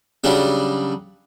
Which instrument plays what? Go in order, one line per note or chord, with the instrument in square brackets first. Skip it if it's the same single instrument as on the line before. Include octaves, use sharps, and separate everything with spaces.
[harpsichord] C#3 F#3 G3 D4